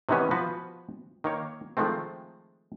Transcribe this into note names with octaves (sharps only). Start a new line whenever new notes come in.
C3 D#3 E3 B3 C#4
F3 B3 F#4 B4
D#3 A#3 C#5
D#3 F3 G#3 A3 C4